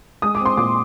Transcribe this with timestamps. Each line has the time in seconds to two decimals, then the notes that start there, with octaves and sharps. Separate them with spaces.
0.22 G#3 D#6
0.35 D6
0.40 C4
0.46 C6
0.57 A#2 D6